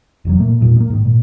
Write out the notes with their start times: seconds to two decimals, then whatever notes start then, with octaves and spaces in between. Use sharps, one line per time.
0.25 F1 E2 F#3
0.40 A#2 A3 A#3
0.60 E1 G2 A#2
0.77 G#3 A#3
0.90 G#2 D#3
1.05 A#2